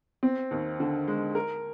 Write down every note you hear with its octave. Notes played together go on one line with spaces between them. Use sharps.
C4
D#2
D3
G#3
A#4